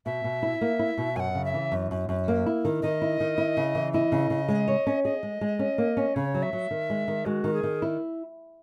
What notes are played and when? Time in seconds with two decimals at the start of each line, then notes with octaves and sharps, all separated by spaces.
0.06 B2 E5
0.24 B2
0.43 E4
0.61 A#3
0.79 E4
0.98 B2
1.16 F#2 G#5
1.20 F#5
1.35 C#3
1.45 E5
1.54 E3
1.72 F#2
1.91 F#2
2.09 F#2
2.28 A#3
2.46 E4
2.65 D#3
2.82 D#3 D#5
3.02 E4
3.20 D#3
3.38 E4
3.57 C#3
3.75 E3
3.93 E4 D#5
4.12 C#3
4.30 C#3
4.48 G#3
4.68 C#5
4.87 C#4
5.04 G#4 D#5
5.23 G#3
5.41 G#3
5.59 C#4
5.78 A#3
5.97 C#4
6.15 C#3 C#5
6.34 F#3
6.43 E5
6.53 F#3
6.71 D#3
6.90 G#3
7.08 D#3
7.26 G#3 F#4
7.44 D#3
7.54 G#4
7.63 D#3
7.82 E4